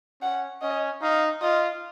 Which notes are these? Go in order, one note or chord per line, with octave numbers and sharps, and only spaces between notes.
C#4 F#5
C#4 D#5
D#4 F5
F4 D#5